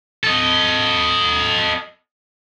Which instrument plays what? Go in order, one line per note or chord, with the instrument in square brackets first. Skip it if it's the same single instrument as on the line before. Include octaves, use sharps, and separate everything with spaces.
[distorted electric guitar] A4 D#5